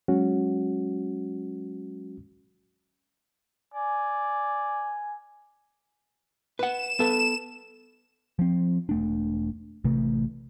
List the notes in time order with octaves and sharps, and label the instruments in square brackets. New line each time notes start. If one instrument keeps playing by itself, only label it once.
[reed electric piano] F#3 G#3 C#4 F#4
[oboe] D5 [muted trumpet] G#5
[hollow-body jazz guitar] B4 F#5 [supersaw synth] E7
[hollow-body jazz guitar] B3 A4 B4
[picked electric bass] F3 C4
E1 A3 D4
A1 C3 A3